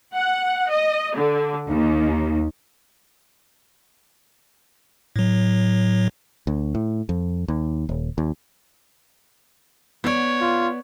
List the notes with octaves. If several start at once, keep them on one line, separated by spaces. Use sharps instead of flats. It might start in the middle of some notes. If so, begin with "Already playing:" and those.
F#5
D#5
D3
D#2
A2 F#3
D2
A2
F2
D#2
D#1
D#2
B3 C#5 D5
F4